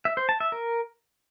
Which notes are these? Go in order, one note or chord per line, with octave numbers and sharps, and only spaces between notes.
E5
C5
A5
E5
A#4